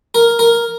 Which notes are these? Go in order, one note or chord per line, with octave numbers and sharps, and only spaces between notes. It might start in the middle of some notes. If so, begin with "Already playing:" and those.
A#4
A#4